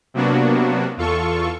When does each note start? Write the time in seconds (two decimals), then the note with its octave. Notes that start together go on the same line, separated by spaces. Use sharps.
0.14 C3 F#3 A#3 B3 D4 F#4
0.97 E2 F4 A4 C#6